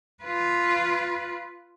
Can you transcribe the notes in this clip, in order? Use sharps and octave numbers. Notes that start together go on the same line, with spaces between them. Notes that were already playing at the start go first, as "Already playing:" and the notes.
F4 B4